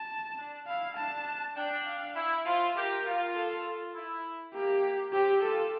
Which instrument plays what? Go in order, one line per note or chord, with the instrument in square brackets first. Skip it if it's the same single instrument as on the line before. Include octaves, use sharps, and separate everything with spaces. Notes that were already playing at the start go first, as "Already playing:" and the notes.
Already playing: [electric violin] A5
[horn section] D4
[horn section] E4 [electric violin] F5
[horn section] D4 [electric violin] A5
[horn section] D4 [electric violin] G5
[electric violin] F5
[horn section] E4
[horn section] F4 [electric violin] C5
[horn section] G4 [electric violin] A#4
[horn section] F4
[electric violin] A4
[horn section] E4
[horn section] A#3 [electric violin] G4
[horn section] C4 [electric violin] G4
[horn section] F4 [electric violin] A4